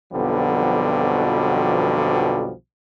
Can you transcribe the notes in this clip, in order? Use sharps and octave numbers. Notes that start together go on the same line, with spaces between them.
B1 F2 B2 D3 F3 G3